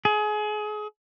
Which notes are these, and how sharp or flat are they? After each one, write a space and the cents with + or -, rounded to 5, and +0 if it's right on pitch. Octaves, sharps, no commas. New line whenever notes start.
G#4 +30